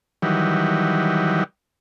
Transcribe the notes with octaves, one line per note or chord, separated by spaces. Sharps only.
D#3 E3 F#3 G3